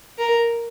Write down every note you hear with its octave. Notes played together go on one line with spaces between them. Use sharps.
A#4